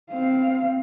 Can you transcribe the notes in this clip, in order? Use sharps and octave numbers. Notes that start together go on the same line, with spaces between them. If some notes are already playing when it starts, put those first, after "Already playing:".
C4 F5